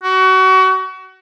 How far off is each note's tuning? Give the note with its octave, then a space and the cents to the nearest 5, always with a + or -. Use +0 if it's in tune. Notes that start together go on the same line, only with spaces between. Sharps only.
F#4 +30